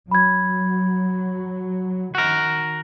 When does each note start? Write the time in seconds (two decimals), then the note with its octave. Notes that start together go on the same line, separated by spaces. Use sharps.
0.11 F#3 B5 G#6
2.15 D#3 F#4 A#4